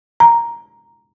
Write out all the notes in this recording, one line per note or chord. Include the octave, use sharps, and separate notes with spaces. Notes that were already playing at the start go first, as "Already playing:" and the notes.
A#5